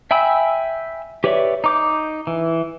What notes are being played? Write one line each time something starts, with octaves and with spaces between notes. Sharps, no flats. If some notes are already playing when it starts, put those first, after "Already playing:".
E5 G5 G#5 B5 E6
G4 B4 C#5 D5 E5
D#4 D6 G6
E3